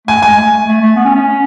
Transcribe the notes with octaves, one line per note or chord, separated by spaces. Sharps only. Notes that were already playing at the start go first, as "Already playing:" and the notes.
A3 G#5
G#3 G#5
A3
A3
A3
A3
B3
C#4
C#4